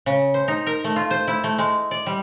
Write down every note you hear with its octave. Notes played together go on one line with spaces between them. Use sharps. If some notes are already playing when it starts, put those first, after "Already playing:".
C#3
C5
D#4
A#4
A3
F4
C5
E4
A3
G#3
D5
G3